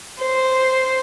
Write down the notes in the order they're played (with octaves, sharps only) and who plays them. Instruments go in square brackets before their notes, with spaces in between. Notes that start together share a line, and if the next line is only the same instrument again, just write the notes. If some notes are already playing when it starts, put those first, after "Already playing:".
[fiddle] C5